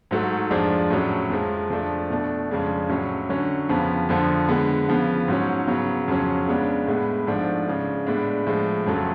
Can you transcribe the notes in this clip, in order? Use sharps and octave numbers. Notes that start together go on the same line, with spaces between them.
G#2 F#3 A3
F2 F3 G#3 D4
A2 F#3 C#4
F2 F3 G#3
F2 F3 A3 D4
B2 A3 D4
F2 C#3 G#3 D4
A2 F#3 C#4
D3 F#3 C#4
F2 C#3 F3 B3
F2 D3 F3
D3 G#3 B3
C#3 F3 B3
G#2 F#3 C#4
C#3 F#3 B3
F2 C#3 F#3 C#4
C#3 G#3 B3 D4
A2 G#3 B3
G#2 F3 A3 D4
C#3 G#3 D4
A2 G#3 B3 D4
A2 F3 G#3
F2 C#3 F#3 A3